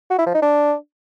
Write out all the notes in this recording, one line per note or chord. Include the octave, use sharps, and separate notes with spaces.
F#4
E4
F3
D#4
D4